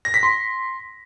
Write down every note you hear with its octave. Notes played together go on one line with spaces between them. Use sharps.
A#6
B6
C6